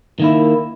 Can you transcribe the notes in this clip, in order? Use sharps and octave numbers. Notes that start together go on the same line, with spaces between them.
D#3 A#3 E4